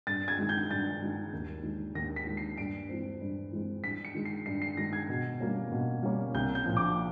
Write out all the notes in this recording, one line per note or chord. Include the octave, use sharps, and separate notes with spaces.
G2 A6
G#6
D#3 G#3
G6
G2 A6
D#3 G#3
D#2
D#3 G#3
D#2 A#6
B6
D#3 G#3
C7
G2 D7
E3 G#3 C4
G2
E3 G#3 C4
G2 B6
C#7
D#3 G#3
C7
G2 C7
C7
D#3 G#3 A#6
G#6
B2
G3 A#3 C#4
B2
G3 A#3 C#4
C2 G6
G6
A#2 F3
D6